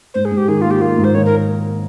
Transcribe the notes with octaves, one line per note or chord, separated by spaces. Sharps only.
G#2 C5
G#4
G#2
G4
D#3 G#4
F4
A#3
G4
A#3 F4
G#2
C5
D#3 C#5
A#4